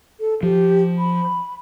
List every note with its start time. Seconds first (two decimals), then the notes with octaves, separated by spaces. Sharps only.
0.20 A4
0.43 F3 G4
0.98 B5